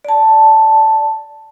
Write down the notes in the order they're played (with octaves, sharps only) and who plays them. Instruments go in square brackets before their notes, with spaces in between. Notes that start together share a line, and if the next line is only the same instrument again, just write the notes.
[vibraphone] D5 A5